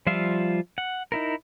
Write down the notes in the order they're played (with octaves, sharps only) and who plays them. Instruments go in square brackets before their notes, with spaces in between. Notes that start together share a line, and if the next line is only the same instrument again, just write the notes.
[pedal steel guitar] F3 G3 F4 E5 F5
F#5
D#4 E4 A#4